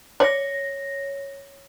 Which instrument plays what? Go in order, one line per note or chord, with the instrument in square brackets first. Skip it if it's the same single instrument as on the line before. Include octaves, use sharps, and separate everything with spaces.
[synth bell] C#5 A#6 [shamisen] D5